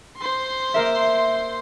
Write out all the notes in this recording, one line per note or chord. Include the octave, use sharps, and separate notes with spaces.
C5 C6
A#3 A#4 E5